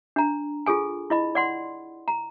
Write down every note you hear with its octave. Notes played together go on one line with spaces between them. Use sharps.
D4 A#5
F4 G#4 A4 G#5
E4 D#5 B5
D5 F#5 C6
A#5